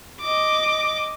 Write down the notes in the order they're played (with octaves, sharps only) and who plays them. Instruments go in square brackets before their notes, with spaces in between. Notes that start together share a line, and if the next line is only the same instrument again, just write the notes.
[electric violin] D#5 D6